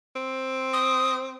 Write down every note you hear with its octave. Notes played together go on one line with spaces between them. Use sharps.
C4
D#6